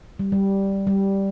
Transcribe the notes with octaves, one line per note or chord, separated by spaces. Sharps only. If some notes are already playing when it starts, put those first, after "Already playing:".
G3
G3
G3